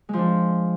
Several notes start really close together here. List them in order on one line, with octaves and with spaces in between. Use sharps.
G#3 F3 D4